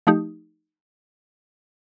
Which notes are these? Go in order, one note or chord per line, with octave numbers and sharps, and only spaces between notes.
F3 A3 D#4 G4